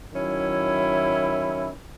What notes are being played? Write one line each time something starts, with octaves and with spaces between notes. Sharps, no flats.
D#3 F#3 C#4 E4